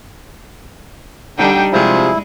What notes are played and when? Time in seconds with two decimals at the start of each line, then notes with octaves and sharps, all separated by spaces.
1.38 D3 G3 D4 D#4 G5
1.72 C3 F3 G#3 E4 G#4